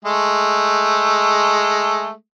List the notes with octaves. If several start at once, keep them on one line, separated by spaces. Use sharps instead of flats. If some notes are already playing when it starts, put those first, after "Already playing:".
G#3 A3